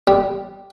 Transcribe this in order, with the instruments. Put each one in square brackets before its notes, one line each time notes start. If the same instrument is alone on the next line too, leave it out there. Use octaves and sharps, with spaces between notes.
[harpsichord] G3